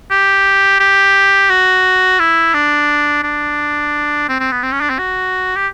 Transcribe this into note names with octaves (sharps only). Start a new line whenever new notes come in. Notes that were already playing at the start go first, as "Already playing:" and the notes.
G4
G4
F#4
E4
D4
D4
C4
C4
B3
C4
C#4
D4
C4
F#4
G4